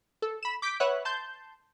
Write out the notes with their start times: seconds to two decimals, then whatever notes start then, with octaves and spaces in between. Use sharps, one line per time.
0.22 A4
0.43 B5 E7
0.62 D6 G6 B6 D7
0.80 B4 C#5 E5 F#5 F#6
1.05 A5 C6 G6